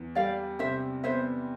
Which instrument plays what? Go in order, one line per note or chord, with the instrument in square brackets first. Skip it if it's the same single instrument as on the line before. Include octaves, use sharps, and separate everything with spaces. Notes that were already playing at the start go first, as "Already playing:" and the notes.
Already playing: [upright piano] E2
[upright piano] G3 [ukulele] D5 F5
[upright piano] C3 [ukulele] C5 E5
[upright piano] B3 [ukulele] C5 E5